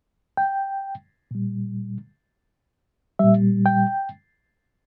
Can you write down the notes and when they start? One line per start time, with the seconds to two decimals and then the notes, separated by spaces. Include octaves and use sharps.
0.37 G5
1.31 A#2 G3
3.19 A#2 G3 E5
3.66 G5